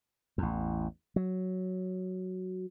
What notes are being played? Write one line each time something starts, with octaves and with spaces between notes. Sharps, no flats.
A1 E2
F#3